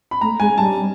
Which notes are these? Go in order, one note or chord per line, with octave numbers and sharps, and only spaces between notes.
B5
A3 A#5
G#3 G#5
G3 A5